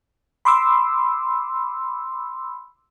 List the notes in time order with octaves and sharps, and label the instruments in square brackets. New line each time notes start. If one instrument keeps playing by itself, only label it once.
[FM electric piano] B5 C6 D6 E6